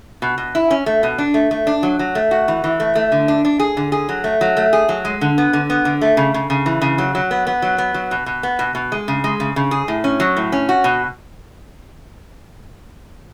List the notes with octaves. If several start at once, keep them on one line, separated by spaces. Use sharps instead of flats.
B2
B2
E4
C#4
A3
B2
D4
A3
A3
D4
F#3
F#3
A3
F#4
E3
E3
A3
A3
D3
D4
D4
G#4
D3
G#4
F#3
A3
F#3
A3
G#4
F#3
G#3
D3
B3
D3
B3
D3
A3
C#3
C#3
C#3
E3
C#3
F#3
F#3
B3
B3
F#3
B3
F#3
B2
B2
B3
B2
B2
G#3
C#3
G#3
C#3
C#3
G#4
A2
C#4
F#3
A2
C#4
F#4
B2